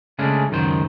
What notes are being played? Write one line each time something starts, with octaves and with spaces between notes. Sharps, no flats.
C#3 G#3 A3 C#4 D4
C#2 F#2 D#3 C5